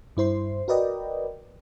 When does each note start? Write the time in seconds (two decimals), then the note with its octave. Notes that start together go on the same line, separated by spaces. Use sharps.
0.17 G2 E4 C5 C6
0.68 F#4 A#4 B4 D5 D#5 G5